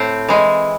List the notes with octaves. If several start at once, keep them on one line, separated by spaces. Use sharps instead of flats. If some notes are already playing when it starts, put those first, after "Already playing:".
Already playing: A2 C4
E3 G#3